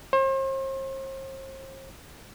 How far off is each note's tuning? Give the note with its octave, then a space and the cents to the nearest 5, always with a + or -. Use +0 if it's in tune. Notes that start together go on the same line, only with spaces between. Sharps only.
C5 +40